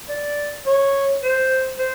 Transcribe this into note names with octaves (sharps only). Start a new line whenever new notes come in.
D5
C#5
C5
C5